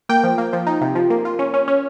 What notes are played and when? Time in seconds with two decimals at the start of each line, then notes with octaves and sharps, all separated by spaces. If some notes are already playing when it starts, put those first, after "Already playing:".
0.09 A#3 G5
0.23 F3
0.38 A#3
0.53 F3
0.67 D#4
0.81 C3
0.95 F3
1.10 A#3
1.25 F4
1.39 C#4
1.54 C#4
1.68 C#4